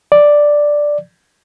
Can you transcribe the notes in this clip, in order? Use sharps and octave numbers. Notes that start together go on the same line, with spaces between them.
D5